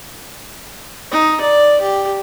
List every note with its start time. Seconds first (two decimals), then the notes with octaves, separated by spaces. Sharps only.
1.11 D#4
1.41 D5
1.81 G4